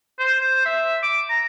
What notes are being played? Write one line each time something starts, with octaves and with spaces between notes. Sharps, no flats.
C5
E5
D6
A#5